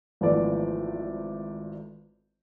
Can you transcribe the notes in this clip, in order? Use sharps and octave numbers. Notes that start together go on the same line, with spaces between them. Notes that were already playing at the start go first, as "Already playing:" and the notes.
G#1 E3 F3 A3 B3 D5